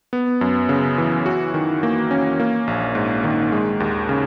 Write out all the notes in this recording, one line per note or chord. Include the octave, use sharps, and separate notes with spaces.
B3
F#2
C#3
E3
F#4
D#3
A#3
C#4
A#3
A#1
G#2
D#3
G#3
D#2
C#3